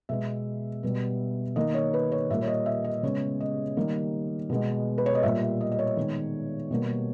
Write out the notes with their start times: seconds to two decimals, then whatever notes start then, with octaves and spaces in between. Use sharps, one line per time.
0.09 B2 G#3 B3 E5
0.83 B2 G3 B3
1.56 D#3 A#3 D#5
1.74 C#5
1.94 B4
2.12 C#5
2.30 A#2 G3 A#3 E5
2.42 C#5
2.47 D#5
2.66 E5
2.84 D#5
3.03 C#3 G#3 B3 C#5
3.40 D#5
3.77 D#3 G3 A#3
4.50 B2 G#3 B3
4.98 B4
5.06 C#5
5.15 D#5
5.23 A#2 G3 A#3 E5
5.42 E5
5.61 D#5
5.72 D#5
5.79 C#5
5.96 D#3 G#3 B3
6.71 B2 G3 A#3